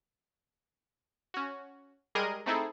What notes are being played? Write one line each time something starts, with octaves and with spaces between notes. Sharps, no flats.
C#4 F#4
G3 G#3 G#4 A#4 D#5 D#7
A3 C4 D#4 E4 G#4 A4